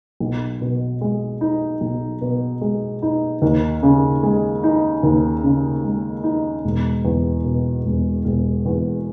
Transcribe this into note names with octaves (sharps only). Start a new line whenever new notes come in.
B1
B2
G#3
D#4
B1
B2
G#3
D#4
D#2
C#3
G#3
D#4
D#2
C#3
G#3
D#4
E1
E2
B2
E1
E1
E2